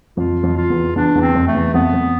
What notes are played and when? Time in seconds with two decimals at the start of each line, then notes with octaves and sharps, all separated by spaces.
0.17 F2 F4
0.43 F2
0.57 F4
0.70 E2
0.96 E2 D4
1.15 E2
1.22 C4
1.35 F2
1.47 A3
1.54 E2
1.74 F2 B3
1.94 F2